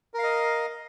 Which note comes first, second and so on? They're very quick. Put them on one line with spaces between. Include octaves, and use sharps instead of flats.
A#4 F5 D#5